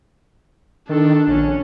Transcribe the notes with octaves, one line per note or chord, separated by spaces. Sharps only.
D#3 D4 A4
A#1 C#4